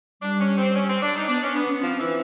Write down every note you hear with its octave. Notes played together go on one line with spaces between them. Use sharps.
G3 D4
C#4
C4
C#4
C4
D4
D#4
B3 D4
C#4
B3 D4
C#4
F3 C4
E3